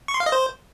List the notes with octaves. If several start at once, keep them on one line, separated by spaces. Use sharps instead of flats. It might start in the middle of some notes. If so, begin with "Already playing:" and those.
C#6
C6
F5
D#5
C5